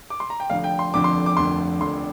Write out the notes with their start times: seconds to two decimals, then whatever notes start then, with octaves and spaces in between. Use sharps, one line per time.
0.10 D6
0.20 C6
0.30 A#5
0.40 G5
0.50 F1 F2 D3 F5
0.64 G5
0.79 C6
0.94 F1 F2 D3 D6
1.04 C6
1.26 D6
1.37 F1 F2 D3 C6
1.81 F1 F2 D3 C6